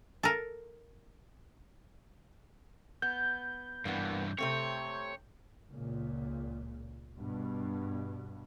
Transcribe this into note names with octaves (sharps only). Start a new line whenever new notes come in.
A4 A#4
B3 G6
G2 E3 A#3 B3
C3 A3 C4 C#5
C#2 A#2
G2 B2